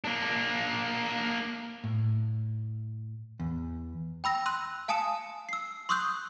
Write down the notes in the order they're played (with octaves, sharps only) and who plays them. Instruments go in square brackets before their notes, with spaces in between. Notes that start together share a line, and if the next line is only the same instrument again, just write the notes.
[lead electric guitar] A#3 D4
[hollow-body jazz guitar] A2
E2
[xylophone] G5 B5 E6 A#6
C6 E6 F#6 D#7
F5 G#5 A5 D#6 C#7 E7
E6 C7
C6 C#6 D#6 E6 F#6 G6